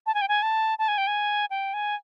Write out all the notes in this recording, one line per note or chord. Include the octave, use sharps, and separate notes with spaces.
A5
G#5
G5
G#5
A5
A5
G#5
G5
G#5
G5
G#5